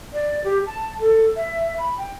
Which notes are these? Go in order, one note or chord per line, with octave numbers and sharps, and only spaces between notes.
D5
G4
A5
A4
E5
B5
G5